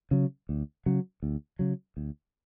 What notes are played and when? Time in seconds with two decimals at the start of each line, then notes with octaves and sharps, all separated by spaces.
0.11 C#3 F#3
0.49 D2
0.86 C#3 F#3
1.23 D2
1.59 C#3 F#3
1.97 D2